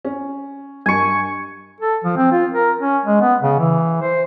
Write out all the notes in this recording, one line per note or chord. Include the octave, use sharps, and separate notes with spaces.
C#4
G2 G#5 C#6
A4
F3
C4
F4
A#4
C#4
G#3
B3
C#3
E3
C5